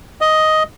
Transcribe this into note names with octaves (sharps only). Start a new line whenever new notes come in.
D#5